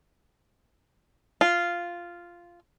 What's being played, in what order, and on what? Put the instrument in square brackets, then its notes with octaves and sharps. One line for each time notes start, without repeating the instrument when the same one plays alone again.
[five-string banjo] F4